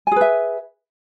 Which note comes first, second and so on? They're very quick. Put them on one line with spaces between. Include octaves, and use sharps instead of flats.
G#5 G#4 B4 E5